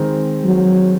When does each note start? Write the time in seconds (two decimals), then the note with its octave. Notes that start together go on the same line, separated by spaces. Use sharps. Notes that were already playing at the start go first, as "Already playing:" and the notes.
Already playing: D#3 G#3 C4
0.44 F#3